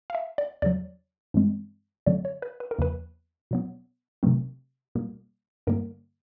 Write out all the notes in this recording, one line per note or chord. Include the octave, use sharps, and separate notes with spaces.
F5
E5
D5
E2 C#3 F#3 D5
G2 E3 G#3 C4
F#2 D3 F#3 A3 C4 D5
C#5
B4
B4
A#4
E2 C#3 F3 A#3 B4
B2 F#3 B3
C3 D#3 F#3 A3 C4
B2 G3 A#3
G2 D3 G3 A#3 A#4